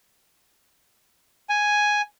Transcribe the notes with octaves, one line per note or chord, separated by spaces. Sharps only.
G#5